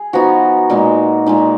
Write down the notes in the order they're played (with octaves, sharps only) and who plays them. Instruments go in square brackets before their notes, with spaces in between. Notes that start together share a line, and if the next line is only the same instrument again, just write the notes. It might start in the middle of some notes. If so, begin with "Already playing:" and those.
Already playing: [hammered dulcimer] G#4
F3 B3 D#4 F#4
A#2 G#3 D#4
A#2 G#3 D#4